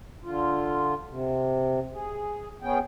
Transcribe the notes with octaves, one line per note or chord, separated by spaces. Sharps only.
D3 F4
C3
G#4
B3 C#4 G#4 G5